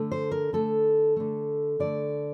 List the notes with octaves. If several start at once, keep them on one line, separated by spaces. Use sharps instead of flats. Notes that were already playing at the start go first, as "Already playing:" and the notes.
Already playing: D3 A3
C5
A#4
D3 A3 A4
D3 A3
D3 A3 D5